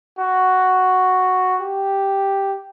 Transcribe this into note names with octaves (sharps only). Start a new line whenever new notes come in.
F#4
G4